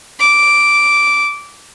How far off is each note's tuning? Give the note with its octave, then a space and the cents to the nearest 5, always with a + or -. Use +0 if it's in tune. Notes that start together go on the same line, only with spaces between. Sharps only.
D6 -5